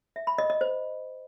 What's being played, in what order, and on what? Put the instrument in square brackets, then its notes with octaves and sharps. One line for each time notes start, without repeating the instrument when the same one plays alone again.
[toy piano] E5
B5
D#5
D#5
C5